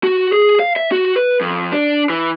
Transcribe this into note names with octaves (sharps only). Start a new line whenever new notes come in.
F#4
G#4
F5
E5
F#4
B4
F2
D4
E3